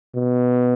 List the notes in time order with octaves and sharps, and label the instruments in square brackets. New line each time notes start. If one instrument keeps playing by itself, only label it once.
[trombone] B2